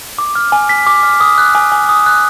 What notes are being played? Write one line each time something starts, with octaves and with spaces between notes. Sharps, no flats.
D6
F6
G#5
B6
D6
F6
D#6
F#6
G#5
G#5
D#6
F#6